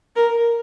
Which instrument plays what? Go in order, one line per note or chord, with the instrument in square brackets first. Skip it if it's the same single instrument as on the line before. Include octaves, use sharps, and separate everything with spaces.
[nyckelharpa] A#4